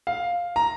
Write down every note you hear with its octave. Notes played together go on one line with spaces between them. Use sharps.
F5
A#5